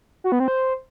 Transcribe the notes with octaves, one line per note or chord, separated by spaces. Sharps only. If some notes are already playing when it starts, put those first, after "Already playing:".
F#4
B3
C4
C5